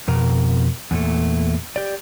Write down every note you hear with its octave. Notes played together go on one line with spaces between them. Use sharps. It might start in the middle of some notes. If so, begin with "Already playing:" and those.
F2 B2 A#4
E2 A#2 A3
G4 D5